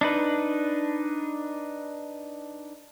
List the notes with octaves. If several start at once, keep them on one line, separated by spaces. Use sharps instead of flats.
D4 D#4 B4